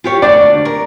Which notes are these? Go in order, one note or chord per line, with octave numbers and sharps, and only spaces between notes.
F4 G4 C#5
D2 D4 D5
A#4